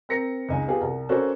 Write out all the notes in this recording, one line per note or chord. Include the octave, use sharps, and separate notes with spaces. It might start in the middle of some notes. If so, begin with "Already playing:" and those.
C4 A#4 A#6 C#7
C#2 G#3 D#4 G#5
B3 F4 G4 G#4
C2
C#4 F#4 A4 A#4 C5 D5